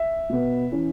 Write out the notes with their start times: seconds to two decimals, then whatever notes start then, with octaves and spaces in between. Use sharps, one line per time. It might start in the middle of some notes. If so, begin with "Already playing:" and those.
Already playing: E5
0.30 B2 B3
0.72 E3 C#4